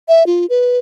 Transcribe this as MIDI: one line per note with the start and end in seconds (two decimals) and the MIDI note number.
0.08 0.26 76
0.26 0.46 65
0.50 0.78 71